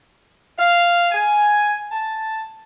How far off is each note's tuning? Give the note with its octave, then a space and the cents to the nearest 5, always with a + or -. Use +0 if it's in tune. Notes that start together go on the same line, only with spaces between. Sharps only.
F5 -5
G#5 +5
A5 +0